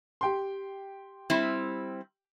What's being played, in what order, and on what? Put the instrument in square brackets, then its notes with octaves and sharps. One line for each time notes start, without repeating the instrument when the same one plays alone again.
[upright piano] G4 G5 C6
[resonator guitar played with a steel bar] G3 C4 E4